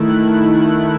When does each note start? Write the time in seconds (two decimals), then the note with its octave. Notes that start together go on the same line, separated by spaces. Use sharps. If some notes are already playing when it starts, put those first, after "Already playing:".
Already playing: D#3 A3 E4
0.08 F#6
0.55 F#6